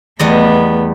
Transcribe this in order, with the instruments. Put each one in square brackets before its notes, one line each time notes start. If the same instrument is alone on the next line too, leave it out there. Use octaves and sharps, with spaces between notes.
[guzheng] E2 G3 D#5 [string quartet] A3 B3